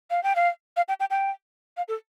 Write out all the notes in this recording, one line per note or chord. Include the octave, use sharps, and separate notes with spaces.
F5
G5
F5
F5
G5
G5
G5
F5
A4